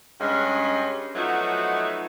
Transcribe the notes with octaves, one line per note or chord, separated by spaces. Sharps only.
G2 G#3 C#4
F3 F#3 A3 B3 D#4 F#4